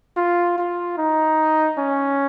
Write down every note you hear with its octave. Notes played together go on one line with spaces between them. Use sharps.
F4
F4
D#4
C#4